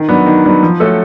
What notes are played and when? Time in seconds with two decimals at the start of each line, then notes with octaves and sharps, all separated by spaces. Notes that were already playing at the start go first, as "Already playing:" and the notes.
Already playing: D#3
0.09 F#3 B3 D4
0.26 D#3
0.44 F#3 B3 D4
0.63 F3
0.80 A3 C#4 F#4 A4